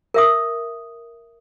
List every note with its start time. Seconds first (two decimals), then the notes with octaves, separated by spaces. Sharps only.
0.14 A#4 E5 D#6